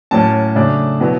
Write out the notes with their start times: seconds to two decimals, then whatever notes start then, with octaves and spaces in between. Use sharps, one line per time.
0.11 A2 F#3 A#3 C#4 A5
0.55 C#3 F#3 A3 D4
1.00 B2 F#3 B3 E4